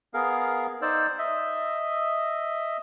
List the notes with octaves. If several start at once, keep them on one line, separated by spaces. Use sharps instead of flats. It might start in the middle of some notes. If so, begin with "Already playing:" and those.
B3 G#4 A#4 F5
D#4 C5 D5 E6
D#5 E5